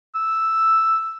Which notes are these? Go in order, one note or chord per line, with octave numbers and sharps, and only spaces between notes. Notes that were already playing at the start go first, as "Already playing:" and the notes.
E6